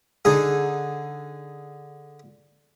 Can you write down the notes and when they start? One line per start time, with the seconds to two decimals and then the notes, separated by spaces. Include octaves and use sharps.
0.25 D3 D4 D#4 G#4